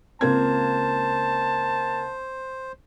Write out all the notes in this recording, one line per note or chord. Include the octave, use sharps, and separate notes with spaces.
C#2 A#3 C4 C5 A5 G#6